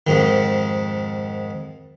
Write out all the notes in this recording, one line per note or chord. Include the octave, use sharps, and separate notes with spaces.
F2 G#2 D#3